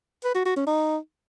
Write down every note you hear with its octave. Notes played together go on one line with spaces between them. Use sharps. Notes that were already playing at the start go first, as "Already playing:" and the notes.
B4
F#4
F#4
C#4
D#4